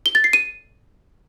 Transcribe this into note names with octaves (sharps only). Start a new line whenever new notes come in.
G7
A6
C7
D#7